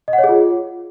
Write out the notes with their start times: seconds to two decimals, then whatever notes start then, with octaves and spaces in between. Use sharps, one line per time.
0.08 D#5
0.13 F#5
0.18 C#5
0.24 G#4
0.29 F4